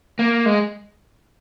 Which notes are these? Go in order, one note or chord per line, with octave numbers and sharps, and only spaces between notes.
A#3
G#3